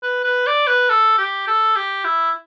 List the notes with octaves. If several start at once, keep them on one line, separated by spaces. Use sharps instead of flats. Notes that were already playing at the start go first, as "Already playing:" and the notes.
B4
B4
D5
B4
A4
G4
A4
G4
E4